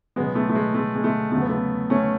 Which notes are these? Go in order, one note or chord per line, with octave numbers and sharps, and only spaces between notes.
C#2 B2 F#3 G#3 B3
A3
A3
G#3
A3
G#3
A3
E2 C#3 F#3 A3
B3
A3
A3 C#4